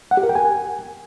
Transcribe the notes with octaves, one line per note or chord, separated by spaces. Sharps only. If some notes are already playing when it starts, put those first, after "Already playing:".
F#5
G4
A#4
G5
G#5